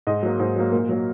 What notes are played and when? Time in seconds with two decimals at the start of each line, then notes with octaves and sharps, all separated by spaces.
0.07 G#2 D#5
0.23 F#3 A#3
0.40 G#2 C5
0.56 F#3 A#3
0.72 A#2 A#4
0.89 F#3 A#3